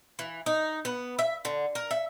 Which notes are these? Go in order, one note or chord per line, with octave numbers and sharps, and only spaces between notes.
E3
D#4
B3
E5
D3
A#4
E5